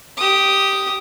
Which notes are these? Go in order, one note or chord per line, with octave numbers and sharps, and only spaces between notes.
G4 D#6